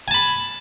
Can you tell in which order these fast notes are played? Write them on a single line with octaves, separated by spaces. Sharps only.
G#5 A5 B5